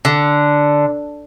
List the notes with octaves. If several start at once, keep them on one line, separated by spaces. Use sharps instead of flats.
D3